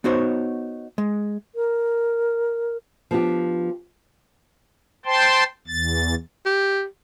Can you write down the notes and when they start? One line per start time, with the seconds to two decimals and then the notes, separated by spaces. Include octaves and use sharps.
0.04 B3 D#4 F#4 C5 C#5
0.98 G#3
1.56 A#4
3.11 F3 B3 D4 G4
5.05 C5 G5 A5 C6
5.67 E2 A6
6.46 G4